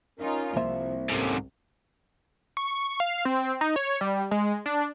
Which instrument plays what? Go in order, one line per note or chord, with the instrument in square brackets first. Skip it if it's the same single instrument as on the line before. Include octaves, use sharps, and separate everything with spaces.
[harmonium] C#4 A#4 [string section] D#4 F4
[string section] C2 [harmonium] F3 [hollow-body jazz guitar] A#3 C5 E5
[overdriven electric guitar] G#2 C3 [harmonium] C#4 A4 A#4
[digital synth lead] C#6
F5
C4
D#4
C#5
G3
G#3
D4